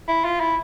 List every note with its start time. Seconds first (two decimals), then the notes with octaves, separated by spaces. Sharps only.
0.08 E4
0.25 F4
0.40 E4